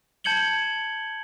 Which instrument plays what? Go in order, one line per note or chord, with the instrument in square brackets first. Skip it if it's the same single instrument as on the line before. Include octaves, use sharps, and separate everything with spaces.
[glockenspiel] A5 G6 G#6 C#7 F#7 G7